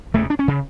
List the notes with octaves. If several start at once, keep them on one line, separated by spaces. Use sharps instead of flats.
E1 E2 C#3 A3
D4
C#4
C#3